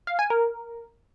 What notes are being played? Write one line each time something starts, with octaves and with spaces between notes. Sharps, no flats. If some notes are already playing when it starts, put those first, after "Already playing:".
F5
G#5
A#4